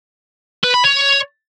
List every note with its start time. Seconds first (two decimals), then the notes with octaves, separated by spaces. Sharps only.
0.64 B4
0.74 B5
0.84 C#5